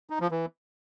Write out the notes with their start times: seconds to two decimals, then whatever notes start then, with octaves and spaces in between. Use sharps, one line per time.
0.10 D#4
0.20 F3
0.31 E3